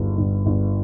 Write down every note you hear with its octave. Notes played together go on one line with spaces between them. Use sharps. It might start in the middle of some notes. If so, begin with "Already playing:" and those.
Already playing: G1 G2 D#3
G1
G1